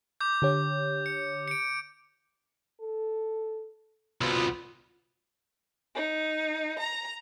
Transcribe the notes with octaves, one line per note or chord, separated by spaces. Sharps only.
D6 G6
D3 G4 C#5
C#7
C#7 D7
A4
C2 B2 B3 F4
D#4
A#5